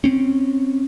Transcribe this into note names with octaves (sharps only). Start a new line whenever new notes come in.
C4 C#4